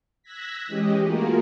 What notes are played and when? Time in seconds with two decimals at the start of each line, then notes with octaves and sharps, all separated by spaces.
0.23 E6 F#6 G#6 A#6 B6
0.67 E3 G#3 C#4 G4 D#5
1.03 A3 A#3 F4 F#4 G#4 A#4